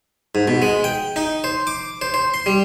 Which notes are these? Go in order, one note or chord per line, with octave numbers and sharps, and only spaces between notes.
G#2
B2
G#3
G5
D#4
C5
D6
C5
C5
C6
G3